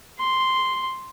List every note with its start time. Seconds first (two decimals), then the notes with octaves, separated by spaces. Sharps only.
0.19 C6